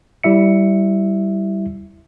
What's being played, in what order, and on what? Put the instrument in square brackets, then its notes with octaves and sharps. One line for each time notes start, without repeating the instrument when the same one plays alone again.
[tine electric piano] G3 E4 E5 C#7